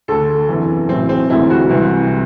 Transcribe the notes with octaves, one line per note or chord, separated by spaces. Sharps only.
D2 D3 A4
F#1 E2 C3 E3
B1 A2 E3 C4
C4
E1 D2 C3 E3 E4
F#4
C2 C3 E3